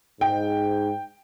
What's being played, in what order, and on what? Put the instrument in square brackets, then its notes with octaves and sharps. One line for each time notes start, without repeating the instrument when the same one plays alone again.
[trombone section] G#2 [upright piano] G5